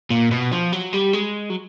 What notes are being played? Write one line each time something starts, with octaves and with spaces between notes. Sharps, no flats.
A#2
B2
F3
F#3
G3
G#3
F#3